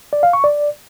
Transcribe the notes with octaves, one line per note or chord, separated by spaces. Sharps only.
D5
F5
C#6
D5